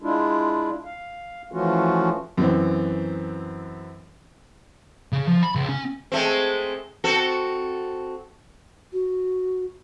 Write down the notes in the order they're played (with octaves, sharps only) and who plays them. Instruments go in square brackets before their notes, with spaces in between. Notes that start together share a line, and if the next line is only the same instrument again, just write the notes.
[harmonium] G#3 D4 E4 F4
F5
E3 F3 A3 C#4 F4 F#4
[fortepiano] F#2 E3 C4
[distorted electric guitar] C#3
F3
B5
C#2
C#4
[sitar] G#3 A3 C4
C4 F#4 A4
[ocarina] F#4